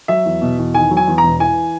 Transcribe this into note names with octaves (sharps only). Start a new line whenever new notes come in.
F#3 E5
E2
B2
E2
D#3 G#5
F#3
G#5
E2
A#5
E1
E3 G#5